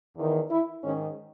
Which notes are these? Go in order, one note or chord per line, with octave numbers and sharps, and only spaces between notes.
E2 D#3
E4
G#2 D#3 C#4